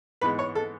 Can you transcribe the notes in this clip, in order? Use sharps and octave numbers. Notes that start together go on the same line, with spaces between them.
G#2 E3 G#3 B3 B4
C#5
A4